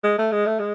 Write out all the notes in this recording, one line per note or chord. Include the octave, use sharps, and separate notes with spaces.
G#3
A3
G#3
A3
G#3